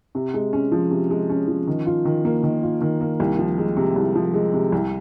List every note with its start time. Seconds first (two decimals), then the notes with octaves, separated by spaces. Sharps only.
0.15 C3
0.34 G#3
0.53 C#4
0.72 F3
0.91 C3
1.10 G#3
1.30 C#4
1.48 F3
1.67 D#3
1.86 F4
2.05 D#3
2.25 A#3
2.43 D#3
2.63 F4
2.81 D#3
3.01 A#3
3.20 C2
3.39 F3
3.58 G#3
3.77 C3
3.96 C2
4.15 F3
4.34 G#3
4.53 C3
4.72 C2